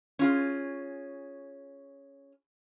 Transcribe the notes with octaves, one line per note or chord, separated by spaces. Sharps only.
C#4 F4 G#4